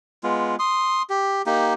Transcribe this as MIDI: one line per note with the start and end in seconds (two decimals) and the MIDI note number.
0.23 0.56 56
0.23 0.56 59
0.23 0.56 65
0.59 1.02 84
0.59 1.02 87
1.10 1.42 67
1.46 1.74 58
1.46 1.74 63
1.46 1.74 67